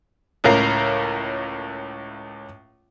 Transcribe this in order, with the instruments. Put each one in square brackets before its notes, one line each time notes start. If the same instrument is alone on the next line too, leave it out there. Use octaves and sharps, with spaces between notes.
[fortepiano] C#2 A2 A#4 F5